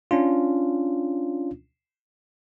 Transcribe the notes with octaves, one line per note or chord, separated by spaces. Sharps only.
C#4 D4 F4